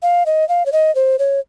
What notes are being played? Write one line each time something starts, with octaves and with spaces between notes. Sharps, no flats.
F5
D#5
F5
C#5
D#5
C5
C#5